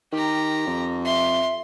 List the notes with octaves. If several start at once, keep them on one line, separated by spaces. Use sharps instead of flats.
D#3 G4 A#5
F2
E5 C6